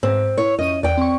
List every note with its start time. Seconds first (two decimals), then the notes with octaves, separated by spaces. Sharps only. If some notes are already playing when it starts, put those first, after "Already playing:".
0.03 G#2 C4
0.38 E4 C#5
0.59 F2 C#4 D#5 D#7
0.83 E2 D5 G5
0.97 C4 C#6